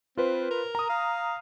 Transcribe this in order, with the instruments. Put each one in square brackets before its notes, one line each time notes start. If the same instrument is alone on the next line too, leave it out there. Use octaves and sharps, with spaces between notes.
[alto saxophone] C4 [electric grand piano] F4 B4 C5
[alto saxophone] A#4
[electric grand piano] A#5 D#6
[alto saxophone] F5